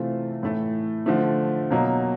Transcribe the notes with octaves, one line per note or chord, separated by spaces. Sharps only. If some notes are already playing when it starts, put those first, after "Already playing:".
Already playing: C3 E3 A3 C4 F4
A2 E3 A3
D3 F3 A3
B2 F#3 A#3 D#4